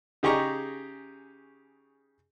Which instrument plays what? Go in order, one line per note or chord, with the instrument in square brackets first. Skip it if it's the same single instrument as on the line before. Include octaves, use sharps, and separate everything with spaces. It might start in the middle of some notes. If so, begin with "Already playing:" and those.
[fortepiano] C#3 D#4 G4 G#4 A#5 C#6